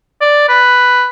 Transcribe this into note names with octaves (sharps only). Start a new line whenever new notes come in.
D5
B4